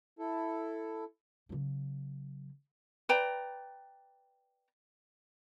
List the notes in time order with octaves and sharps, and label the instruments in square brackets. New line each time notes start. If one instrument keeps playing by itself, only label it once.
[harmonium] E4 A4
[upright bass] C#3 F#3
[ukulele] B4 D5 G5 A#5